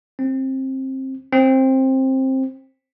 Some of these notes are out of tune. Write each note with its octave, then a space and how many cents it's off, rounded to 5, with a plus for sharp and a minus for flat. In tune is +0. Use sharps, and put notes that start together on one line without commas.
C4 +20
C4 +15